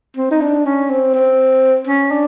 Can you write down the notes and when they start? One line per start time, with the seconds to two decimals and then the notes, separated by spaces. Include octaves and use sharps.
0.17 C4
0.31 D#4
0.41 D4
0.66 C#4
0.90 C4
1.14 C4
1.87 C#4
2.11 D4